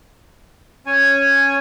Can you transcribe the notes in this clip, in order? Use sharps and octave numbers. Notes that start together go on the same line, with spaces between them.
C#4 C#5 G#5